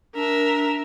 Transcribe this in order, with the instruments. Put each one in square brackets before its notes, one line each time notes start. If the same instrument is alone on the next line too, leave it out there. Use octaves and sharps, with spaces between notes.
[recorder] D4 [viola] A#4 E5